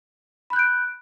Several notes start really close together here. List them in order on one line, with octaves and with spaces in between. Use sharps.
B5 F#6 G6 D7